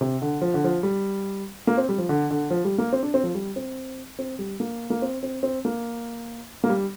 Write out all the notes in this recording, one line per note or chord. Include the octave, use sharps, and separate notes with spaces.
C3
D3
F3
D3
F3
G3
A#3
C4
G3
F3
D3
D3
F3
G3
A#3
C4
D4
C4
F3
G3
C4
C4
G3
A#3
A#3
C4
C4
C4
A#3
A#3
G3